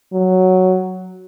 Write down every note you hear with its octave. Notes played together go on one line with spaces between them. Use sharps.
F#3